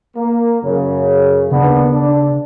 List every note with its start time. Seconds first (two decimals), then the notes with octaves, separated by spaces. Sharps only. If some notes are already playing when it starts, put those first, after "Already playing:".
0.16 A#3
0.63 F#2 C#3
1.51 D#2 C#3 B3 D4
1.94 D4